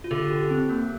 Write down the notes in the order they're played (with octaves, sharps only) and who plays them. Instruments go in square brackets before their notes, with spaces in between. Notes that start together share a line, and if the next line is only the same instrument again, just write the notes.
[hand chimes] F4
[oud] D3 [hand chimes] G4
[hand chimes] G4
C4
A#3